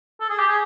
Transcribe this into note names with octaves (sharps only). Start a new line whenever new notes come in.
A4
G#4
G4
G#4